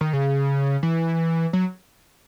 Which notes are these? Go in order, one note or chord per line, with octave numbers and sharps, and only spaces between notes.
D#3
C#3
E3
F#3